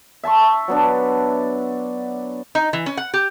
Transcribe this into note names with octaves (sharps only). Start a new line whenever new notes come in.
E5 A5 C6 C#6
F#3 B3 D4
D#4
E3
C#4
F#5
G4